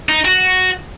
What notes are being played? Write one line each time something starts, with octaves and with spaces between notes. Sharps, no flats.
D#4
F#4